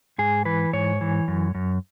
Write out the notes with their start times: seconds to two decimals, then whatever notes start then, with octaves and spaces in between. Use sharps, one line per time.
0.18 G#2 G#4
0.45 E3 B4
0.73 G#2 C#5
1.01 E3
1.28 F#2
1.55 F#2